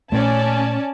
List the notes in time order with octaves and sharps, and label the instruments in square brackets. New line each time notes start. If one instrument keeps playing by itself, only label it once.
[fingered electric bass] A#2 A3 [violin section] C#4 D5 A5